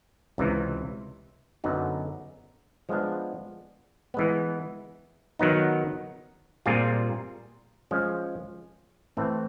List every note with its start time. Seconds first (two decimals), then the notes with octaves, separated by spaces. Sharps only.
0.38 C#2 C3 E3
1.64 F#2 D3 F#3 B3 D#4
2.89 F3 G#3 B3 D4
4.14 E3 G#3 B3
5.39 D#3 F#3 B3 D#4
6.66 A#2 G3 C4 F4 G#4
7.91 F3 G#3 C#4
9.17 A2 E3 A3 C4